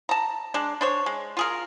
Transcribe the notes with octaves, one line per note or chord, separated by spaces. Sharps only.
A5 A#5
G#3 D4
D4 C5 C#5
G#3
F4 G#4 A#4